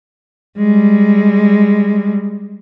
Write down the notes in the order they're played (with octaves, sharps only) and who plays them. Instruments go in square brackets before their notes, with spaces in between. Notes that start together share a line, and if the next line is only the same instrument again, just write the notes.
[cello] G3 G#3